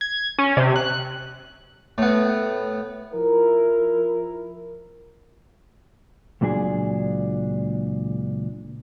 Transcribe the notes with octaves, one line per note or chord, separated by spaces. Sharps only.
G#6
C#4
C3
F#6
A2 B3
F3 E4 A#4
C#2 A#2 F#3 D4 G4 G#4